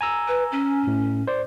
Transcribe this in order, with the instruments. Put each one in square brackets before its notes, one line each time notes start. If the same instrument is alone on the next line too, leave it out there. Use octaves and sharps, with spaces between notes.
[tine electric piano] G#5 A#5 E6
[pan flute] B4
C#4
[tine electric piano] A2
C5 D5